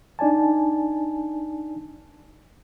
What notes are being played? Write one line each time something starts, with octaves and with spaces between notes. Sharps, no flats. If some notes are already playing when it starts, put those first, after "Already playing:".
D4 D#4 D5 G#5 A5